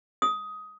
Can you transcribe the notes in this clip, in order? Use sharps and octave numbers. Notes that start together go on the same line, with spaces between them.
D#6